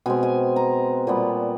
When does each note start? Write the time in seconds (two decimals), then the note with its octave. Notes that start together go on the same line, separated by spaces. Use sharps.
0.06 B2 G#3 C4 G#5
0.23 G#5
0.56 A#5
1.07 A#2 G3 B3